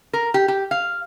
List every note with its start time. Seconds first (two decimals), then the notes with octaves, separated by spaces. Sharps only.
0.13 A#4
0.34 G4
0.48 G4
0.71 F5